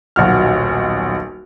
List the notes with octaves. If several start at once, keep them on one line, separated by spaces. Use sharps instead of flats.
D#1 B1 F#4 F6